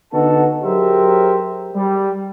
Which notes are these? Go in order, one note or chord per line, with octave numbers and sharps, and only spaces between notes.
D3 B3 D#4 F#4 A4 A5
F#3 G4 G#4 A#4 C5 E5
G3